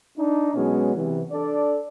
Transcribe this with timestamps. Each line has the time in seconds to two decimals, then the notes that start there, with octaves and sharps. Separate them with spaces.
0.18 D4 D#4
0.55 B2 F#3 G#3 B3 C#4
0.95 C3 E3
1.32 D4 A4 D5